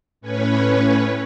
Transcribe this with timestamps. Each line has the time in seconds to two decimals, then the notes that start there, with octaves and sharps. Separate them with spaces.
0.21 A2 C#4 B4 C#5